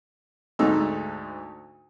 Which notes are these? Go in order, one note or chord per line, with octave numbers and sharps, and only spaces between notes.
D2 G#2 A3 D#4 E6